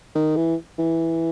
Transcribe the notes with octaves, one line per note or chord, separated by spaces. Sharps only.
D#3
E3
E3